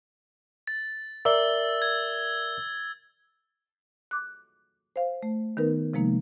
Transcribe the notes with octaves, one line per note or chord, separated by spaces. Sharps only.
A6
A#4 D5 E5 E6 G7
G#6
D6 F#6
C5 F5
A3
D#3 B3 D#4 A#4 B4
C3 F3 G#3 A#3 D#4